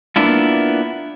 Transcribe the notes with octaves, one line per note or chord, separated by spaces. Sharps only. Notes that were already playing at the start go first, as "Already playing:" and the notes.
A#3 B3 D4 E4 F4